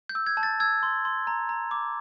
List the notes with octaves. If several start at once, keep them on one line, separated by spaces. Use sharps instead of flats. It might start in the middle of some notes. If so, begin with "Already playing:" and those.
G6
E6
G#6
A5
A6
E6 G#6
C6
C6
A#5
A#5
D6